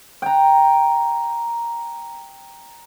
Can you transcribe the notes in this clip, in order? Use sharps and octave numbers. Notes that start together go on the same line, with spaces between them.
G5 A#5